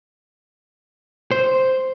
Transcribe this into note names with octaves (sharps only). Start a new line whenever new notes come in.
C5